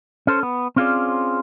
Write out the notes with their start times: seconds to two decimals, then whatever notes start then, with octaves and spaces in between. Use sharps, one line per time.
0.27 C#4 A4 C5
0.43 B3
0.76 C4 C#4 F4 G#4 C5 D5